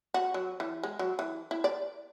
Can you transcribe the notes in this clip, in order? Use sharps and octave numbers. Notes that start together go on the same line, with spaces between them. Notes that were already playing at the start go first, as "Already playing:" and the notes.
F#4
F#3
E3
G#3
F#3
E3
E4
D5